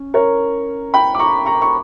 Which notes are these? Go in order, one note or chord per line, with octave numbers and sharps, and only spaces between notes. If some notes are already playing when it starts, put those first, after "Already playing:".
Already playing: C#4
A#4 C#5
G5 B5
D6
A#5 C#6
A#5 C#6
C#6